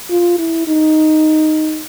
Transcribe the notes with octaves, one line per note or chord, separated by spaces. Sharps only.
F4
E4
D#4